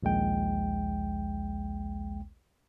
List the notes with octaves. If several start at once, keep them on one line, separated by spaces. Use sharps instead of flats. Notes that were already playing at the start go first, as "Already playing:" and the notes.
A#1 D#2 G#3 G5